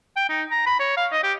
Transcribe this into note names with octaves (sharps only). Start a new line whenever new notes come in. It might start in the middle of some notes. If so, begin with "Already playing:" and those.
G5
D#4
A#5
B5
C#5
F5
D#5
G4